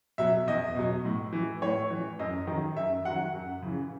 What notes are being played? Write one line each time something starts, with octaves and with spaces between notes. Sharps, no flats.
B2 F#3 E5
E2 D#5
B2 F#3
A2
E3
A2 C#5
E3
F#2 D#5
D#3 F#3
F#2 E5
D#3 F#3 F#5
F#2
C#3 E3